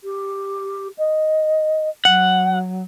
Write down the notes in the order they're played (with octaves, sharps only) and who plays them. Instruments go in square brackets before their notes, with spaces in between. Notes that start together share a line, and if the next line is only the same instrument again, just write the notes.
[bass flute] G4
D#5
[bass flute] F#3 [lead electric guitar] F#5